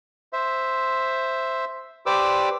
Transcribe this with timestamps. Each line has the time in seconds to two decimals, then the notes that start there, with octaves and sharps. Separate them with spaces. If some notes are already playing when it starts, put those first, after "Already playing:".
0.33 C5 E5
2.06 G4 B4 C5 D5 D6 E6